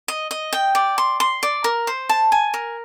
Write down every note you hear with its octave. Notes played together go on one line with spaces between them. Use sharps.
D#5
D#5
G5
D5
C6
C6
D5
A#4
C5
A5
G#5
A#4